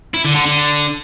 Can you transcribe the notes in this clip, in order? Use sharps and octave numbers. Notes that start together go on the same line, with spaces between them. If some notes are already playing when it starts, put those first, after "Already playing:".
E4
D3
D3
D3